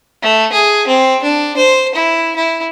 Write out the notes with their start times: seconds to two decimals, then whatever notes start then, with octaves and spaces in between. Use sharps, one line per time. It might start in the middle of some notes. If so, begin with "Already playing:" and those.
0.22 A3
0.52 G#4
0.87 C4
1.23 D4
1.57 C5
1.95 E4
2.36 E4